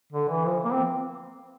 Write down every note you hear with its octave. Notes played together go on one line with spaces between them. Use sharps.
D3
E3
F3
A#3
C4